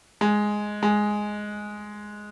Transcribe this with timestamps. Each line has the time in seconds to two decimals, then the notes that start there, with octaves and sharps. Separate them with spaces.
0.21 G#3
0.83 G#3